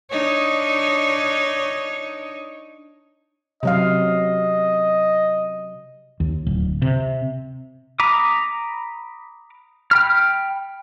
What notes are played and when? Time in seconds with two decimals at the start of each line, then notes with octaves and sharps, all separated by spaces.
0.11 D4 D#4 C#5
3.63 C3 F#3 D#5 F5
6.20 D#2
6.46 D1
6.82 C3
8.00 A#5 B5 D6 D#6
9.91 G5 B5 F6